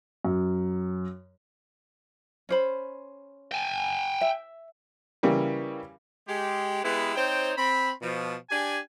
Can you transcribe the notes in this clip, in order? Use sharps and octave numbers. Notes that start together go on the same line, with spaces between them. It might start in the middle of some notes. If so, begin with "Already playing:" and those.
F#2
C#4 C5 B5
G5 G#5
E5
C#3 E3 G3 A#3
G#3 G4
G#3 B3 E4 G4 B4
C4 D#4 C5 C#5 G5
C4 B5
B2 F3
D4 G4 G#5